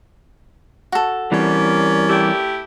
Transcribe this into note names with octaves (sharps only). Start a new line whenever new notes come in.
F#4 A4
E3 G3 C4 C#4 A#4 D5
A3 E4 G4